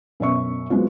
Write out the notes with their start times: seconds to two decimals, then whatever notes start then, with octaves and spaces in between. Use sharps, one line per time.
0.20 F#2 B2 E5 C#6
0.70 F#3 G#3 B3 C4 F4